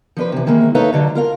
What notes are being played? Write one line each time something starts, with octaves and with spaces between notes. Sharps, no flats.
F3 D4 B4
C3 E3
D#3 E3 G#3 A#3
D#4 A4 B4 C#5 E5 F5
G#2 D3 F#3
F4 A#4 F5